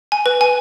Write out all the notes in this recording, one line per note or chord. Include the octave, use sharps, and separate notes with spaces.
G#5
B4
G#5